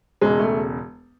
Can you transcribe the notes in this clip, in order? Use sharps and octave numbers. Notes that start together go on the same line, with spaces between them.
E1 E2 C#3 G#3
A3